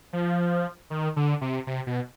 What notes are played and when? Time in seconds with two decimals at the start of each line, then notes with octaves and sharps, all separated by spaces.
0.13 F3
0.90 D#3
1.16 D3
1.41 C3
1.67 C3
1.87 B2